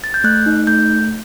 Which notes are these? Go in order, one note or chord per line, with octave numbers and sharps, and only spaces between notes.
A6
G6
A3 F#6
D#4
A3 G6